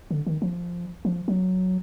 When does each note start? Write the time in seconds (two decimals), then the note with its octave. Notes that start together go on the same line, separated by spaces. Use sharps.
0.11 D3
0.27 D#3
0.42 F3
1.05 F3
1.28 F#3